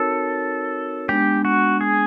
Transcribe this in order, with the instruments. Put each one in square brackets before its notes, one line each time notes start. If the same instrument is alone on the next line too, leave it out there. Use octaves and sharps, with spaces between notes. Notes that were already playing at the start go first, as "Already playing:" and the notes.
Already playing: [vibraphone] C4 D#4 F#4 A#4 C#5 [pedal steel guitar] A4
[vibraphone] G#3 B3 D4 [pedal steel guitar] G4
[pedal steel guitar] F#4
G#4